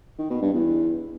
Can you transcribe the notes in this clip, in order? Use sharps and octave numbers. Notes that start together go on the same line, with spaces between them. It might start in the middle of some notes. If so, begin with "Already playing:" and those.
D#3
B2
G2
E2